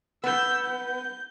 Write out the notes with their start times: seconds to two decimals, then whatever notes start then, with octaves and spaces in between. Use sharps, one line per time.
0.24 B3 E6 G6
0.65 G6